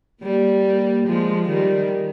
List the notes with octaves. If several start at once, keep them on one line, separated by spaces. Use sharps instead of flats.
G3 A#3
F3 G#3
D#3 G3